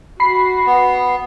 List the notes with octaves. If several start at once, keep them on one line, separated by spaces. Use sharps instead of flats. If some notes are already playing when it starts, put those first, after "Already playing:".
F#4 B5 C7
B3